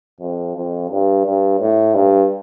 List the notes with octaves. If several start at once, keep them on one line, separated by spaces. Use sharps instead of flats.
F2
F2
G2
G2
A2
G2